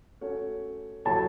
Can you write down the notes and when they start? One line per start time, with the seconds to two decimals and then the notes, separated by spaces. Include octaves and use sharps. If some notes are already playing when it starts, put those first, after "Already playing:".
0.21 A3 C#4 F#4 A4 C#5
1.05 F#3 A3 E4 G4 C#5 A5